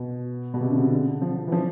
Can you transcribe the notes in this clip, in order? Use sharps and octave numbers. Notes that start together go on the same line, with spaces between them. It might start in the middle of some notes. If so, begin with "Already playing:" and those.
Already playing: B2
B2
C3
D3
C#3
D3
F3
E3
F3